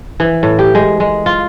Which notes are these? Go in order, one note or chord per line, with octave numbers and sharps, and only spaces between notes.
E3
A2
G4
G#3
G#3
F4